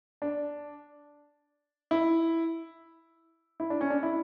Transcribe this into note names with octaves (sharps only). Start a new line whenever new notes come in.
D4
E4
E4
D4
C#4
D4
E4